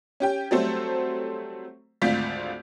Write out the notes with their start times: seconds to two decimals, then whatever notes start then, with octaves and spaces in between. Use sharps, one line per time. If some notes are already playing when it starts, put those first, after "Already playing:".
0.20 C#4 G4 G5
0.51 F#3 G3 A3 C4 A4 C5
2.02 G#1 D2 F4 D5 G6 B6